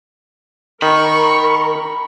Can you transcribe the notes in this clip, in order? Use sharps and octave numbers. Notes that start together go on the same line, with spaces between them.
D#3 A#4 B5 C#6